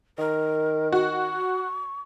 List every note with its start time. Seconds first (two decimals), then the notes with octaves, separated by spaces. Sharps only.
0.19 D#3 A#4
0.92 F#4 C#6